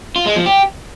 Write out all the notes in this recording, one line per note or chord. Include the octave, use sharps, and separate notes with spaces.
F4
G#3
F3
G4